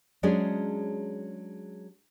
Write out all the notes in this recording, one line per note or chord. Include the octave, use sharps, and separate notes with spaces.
F#3 G#3 C#4 D4 G#4